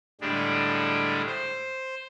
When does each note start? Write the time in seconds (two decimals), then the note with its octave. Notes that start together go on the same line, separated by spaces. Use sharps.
0.21 A2 D3 G3 G#3 D4
1.26 C5